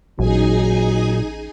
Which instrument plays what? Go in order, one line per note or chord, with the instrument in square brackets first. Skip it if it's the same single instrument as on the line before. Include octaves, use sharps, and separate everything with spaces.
[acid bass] A1 [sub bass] A#2 [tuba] F#3 [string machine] D#4 G#4 G#5